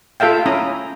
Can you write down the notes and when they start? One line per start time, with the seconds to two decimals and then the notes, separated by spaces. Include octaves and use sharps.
0.20 F4 A4 E5 F5 G5
0.46 C#4 E4 A#5 D#6